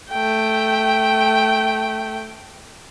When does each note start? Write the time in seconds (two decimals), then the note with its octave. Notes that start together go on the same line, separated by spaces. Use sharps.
0.11 A3 G5